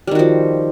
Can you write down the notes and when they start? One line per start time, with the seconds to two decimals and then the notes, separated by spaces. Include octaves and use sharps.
0.07 G3
0.11 D#3
0.15 F#4
0.19 F3